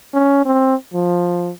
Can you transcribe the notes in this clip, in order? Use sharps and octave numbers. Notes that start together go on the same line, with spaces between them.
C#4
C4
F3